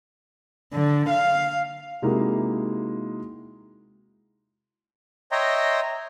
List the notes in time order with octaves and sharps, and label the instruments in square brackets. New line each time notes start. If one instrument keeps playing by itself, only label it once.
[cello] D3
F5
[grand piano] C3 G#3 A#3 D#4 E4 F#4
[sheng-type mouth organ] C#5 D#5 E5 G5 A#5 C6